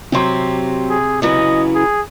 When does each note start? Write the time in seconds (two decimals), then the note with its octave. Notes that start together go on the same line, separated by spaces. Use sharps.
0.12 C3 F#3 C4 G4 C6
0.90 G#4
1.22 C#3 E3 F#3 D#5
1.75 G#4